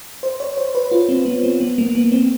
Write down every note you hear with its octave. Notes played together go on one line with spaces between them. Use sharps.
C5
C#5
C5
B4
F4
C4
B3
C4
B3
A#3
B3
C4